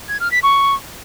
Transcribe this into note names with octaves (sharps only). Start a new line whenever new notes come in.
G#6
F6
B6
C#6